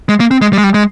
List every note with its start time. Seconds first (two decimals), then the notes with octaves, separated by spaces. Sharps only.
0.09 G#3
0.20 A#3
0.31 C4
0.42 G#3
0.53 G3
0.58 G#3
0.64 G3
0.74 G#3